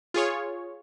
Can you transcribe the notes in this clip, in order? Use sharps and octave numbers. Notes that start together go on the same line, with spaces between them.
F4 G#4 C#5